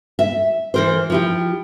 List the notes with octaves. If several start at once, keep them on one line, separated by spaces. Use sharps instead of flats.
E5
E3 A#4 C5
F3 E4 G4